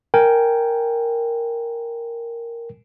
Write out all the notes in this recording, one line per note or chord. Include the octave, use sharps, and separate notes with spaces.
A#4 G5 G#5